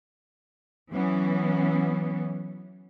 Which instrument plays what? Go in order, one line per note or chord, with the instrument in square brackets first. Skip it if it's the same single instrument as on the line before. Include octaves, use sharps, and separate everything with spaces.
[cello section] E3 F#3 B3 C#4